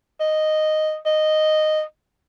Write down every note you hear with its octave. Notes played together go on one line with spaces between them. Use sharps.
D#5
D#5